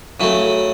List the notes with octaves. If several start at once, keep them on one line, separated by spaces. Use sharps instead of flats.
C#3 F#3 A3 E4